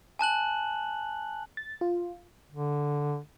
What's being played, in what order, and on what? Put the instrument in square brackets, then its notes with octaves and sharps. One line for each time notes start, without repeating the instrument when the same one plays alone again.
[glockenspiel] G#5 A5 F#6 F#7
[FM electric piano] A6
F4
[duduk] D3